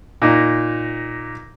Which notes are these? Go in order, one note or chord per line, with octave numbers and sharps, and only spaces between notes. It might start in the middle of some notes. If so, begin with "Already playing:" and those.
A#2 D#4